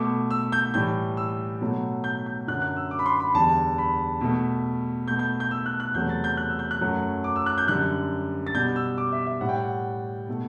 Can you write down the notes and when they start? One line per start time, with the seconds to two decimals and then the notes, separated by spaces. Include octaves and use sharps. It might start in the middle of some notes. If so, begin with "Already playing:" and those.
Already playing: B2 A3 D6
0.31 E6
0.52 G6
0.74 A2 E3 G3 G6
1.17 E6
1.61 B2 F#3 A3
2.04 G6
2.26 G6
2.48 F#2 D3 F#3 F#6
2.62 F#6
2.76 E6
2.91 D6
2.99 B5
3.06 C6
3.20 B5
3.34 E2 D3 G3 A5
3.78 B5
4.21 B2 A3
5.08 B2 A3 G6
5.19 G6
5.40 G6
5.51 E6
5.66 F#6
5.80 F#6
5.94 E2 C3 F#3 A3 G6
6.09 A6
6.24 G6
6.37 F#6
6.49 E6
6.59 G6
6.71 F#6
6.81 F#2 F#3 A3
7.24 D6
7.36 E6
7.46 F#6
7.58 G6
7.68 F#2 D3 G3 F#6
8.47 A6
8.55 B2 G3 G6
8.76 E6
8.98 D6
9.12 E5
9.27 E5
9.41 A2 G3 F#5
9.49 G5
9.56 F#5
10.29 B2 A3